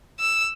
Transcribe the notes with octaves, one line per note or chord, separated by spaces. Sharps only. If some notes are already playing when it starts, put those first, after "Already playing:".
E6